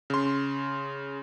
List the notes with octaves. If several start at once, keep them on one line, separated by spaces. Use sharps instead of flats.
C#3 C6